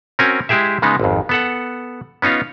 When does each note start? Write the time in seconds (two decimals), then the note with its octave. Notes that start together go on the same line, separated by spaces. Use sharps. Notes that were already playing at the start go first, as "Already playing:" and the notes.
0.19 C4 C#4 F#4 A#4 G#5
0.49 G#3 E4 G4 G#4 E5
0.82 C#3 G#3 B3 D#4
1.00 G#1 F2
1.29 B3 A4 F#5
2.22 B3 C#4 D#4 F4 C#5